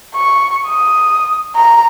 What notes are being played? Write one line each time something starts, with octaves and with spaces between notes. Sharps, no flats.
C#6
D#6
A#5